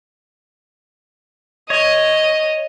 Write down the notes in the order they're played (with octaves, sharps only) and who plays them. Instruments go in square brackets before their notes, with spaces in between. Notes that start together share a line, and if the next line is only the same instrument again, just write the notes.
[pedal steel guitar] C#5 [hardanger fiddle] D#5